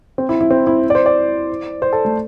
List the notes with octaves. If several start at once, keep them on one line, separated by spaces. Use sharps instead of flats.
C4
E4
E4
C4
E4
D5
C5
D5
C5
A4
A3